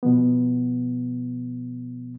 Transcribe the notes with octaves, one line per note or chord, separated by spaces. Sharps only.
B2 F3 B3